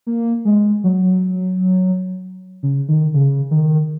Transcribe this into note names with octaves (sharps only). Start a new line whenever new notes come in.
A#3
G#3
F#3
C#3
D#3
C#3
D#3